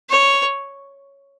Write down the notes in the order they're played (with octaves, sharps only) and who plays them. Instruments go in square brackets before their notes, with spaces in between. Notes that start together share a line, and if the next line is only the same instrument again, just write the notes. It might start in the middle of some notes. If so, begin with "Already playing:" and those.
[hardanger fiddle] C#5